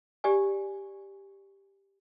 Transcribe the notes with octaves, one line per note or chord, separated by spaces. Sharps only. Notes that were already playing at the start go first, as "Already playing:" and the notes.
G4 D5 G#5